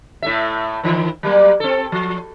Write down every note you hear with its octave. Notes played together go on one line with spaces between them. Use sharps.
A2 A3 E5
D#3 E3
F#3 G3 A#3
C4 A4
F3